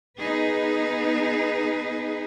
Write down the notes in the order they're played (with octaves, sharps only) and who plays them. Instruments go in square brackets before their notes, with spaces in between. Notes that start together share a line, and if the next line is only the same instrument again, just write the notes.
[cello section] B3 D#4 G#4 B4